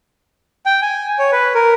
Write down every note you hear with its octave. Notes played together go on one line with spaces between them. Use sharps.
G5
G#5
C#5
B4
A#4